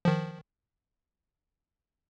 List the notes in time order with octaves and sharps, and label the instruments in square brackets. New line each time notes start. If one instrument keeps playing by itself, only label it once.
[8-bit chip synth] D#3 F3